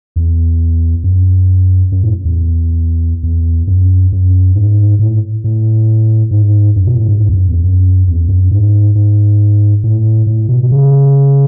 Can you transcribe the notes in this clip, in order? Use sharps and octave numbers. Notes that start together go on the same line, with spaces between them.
E2
F#2
F#2
A2
E2
E2
F#2
F#2
G#2
A2
A2
G#2
F#2
B2
A2
G#2
G#2
E2
F#2
E2
F#2
E2
F#2
G#2
G#2
A2
A2
B2
B2
C#3